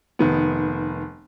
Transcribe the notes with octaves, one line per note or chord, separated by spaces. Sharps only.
F1 D#3 B3